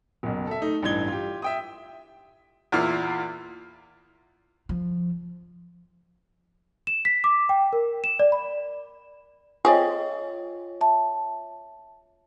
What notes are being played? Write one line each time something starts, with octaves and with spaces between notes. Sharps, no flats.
F#1 B1
A4 E5
A3 D#4
A1 G2 E3 D4 G#6 G7
F4 G4
E5 G5 D#6
E2 A#2 A#3 E4 F4 F6
F3
E7
B6
D6
G5
A#4
E7
D5
B5
C4 F4 G#4 C#5 D#5 G5
E5 A5